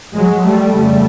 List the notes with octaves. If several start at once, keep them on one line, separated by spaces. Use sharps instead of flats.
F#3 G#3
G3 A3
F2 C#3 G3 A3